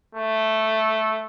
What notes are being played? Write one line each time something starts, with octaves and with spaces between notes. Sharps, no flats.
A3